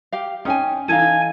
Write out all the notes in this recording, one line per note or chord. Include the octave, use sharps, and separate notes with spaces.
G4 F5
C#4 D#4 G5 G#5
E3 D#4 A4 D#5 F5 G#5